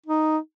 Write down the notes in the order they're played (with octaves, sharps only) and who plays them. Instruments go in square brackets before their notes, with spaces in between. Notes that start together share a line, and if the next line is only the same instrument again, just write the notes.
[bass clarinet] D#4